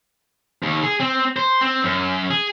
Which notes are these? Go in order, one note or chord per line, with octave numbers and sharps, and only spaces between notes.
D#2
G#4
C4
C5
C4
F#2
G#4